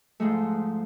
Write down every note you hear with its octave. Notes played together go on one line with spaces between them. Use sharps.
G#2 F3 G#3 A3